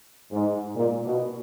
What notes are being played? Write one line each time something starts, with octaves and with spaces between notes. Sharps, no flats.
G#2
A#2
B2